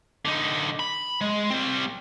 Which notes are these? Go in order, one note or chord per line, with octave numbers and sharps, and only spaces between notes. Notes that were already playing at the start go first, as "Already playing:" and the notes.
D3 D#4
B5
G#3
G3 C4